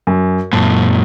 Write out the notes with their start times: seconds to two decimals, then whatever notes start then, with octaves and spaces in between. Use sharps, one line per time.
0.07 F#2
0.53 F#2 A#2 A5